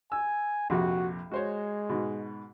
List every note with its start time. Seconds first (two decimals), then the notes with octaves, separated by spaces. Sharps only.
0.12 G#5 E6
0.70 A#1 F2 C3 F#4
1.31 G#3 F#4 C5 C#5
1.89 G#2 B2